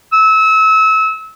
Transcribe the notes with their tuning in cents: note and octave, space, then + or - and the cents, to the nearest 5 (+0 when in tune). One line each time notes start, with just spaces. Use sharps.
E6 -30